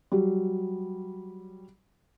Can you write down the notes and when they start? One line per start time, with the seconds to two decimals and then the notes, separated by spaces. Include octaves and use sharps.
0.12 F#3 G3